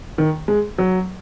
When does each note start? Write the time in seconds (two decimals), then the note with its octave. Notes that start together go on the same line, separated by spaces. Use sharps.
0.18 D#3
0.48 G#3
0.78 F#3